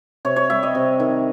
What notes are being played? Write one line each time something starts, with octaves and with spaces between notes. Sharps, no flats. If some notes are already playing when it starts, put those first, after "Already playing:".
C3 C#5
C#5
G3 E5
D#5
C3
D#3